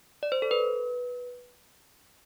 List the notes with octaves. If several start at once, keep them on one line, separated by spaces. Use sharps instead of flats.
D5
C5
A4
B4